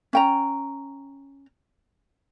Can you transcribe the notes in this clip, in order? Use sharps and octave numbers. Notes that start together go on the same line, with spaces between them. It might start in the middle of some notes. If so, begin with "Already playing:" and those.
C#4 G5 A#5